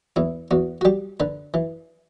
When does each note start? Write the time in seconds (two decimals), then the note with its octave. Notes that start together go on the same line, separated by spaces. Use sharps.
0.16 E2 E4
0.51 E2 F#4
0.81 F#4
0.85 G3 G4
1.20 D3 B4
1.54 E3